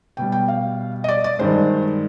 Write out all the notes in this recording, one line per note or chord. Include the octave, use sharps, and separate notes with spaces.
B2 G3 G5
G5
F5
D#5
D5
D5
G2 D#3 G#3 C5